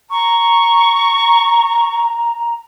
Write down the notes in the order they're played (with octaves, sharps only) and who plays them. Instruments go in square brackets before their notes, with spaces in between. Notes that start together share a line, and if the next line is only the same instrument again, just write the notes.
[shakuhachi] A#5 [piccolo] C#6